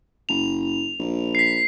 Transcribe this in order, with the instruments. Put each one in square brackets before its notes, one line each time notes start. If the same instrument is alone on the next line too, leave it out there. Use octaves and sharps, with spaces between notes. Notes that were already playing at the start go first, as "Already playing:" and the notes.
[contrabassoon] F#1 [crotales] F7
[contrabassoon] A#1
[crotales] B6 C7